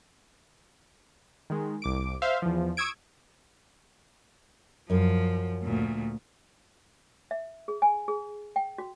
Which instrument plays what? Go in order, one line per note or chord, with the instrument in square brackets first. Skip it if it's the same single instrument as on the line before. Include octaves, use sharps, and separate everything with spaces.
[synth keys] D#3 G#3
C2 D6 D7
C5 E5 F5 C6
E2 F3
C#6 D#6 E6 G#6 D7
[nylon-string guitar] F#2 [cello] F3
[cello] D2 A#2
[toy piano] E5
G#4
G#5
G#4
G5
F#4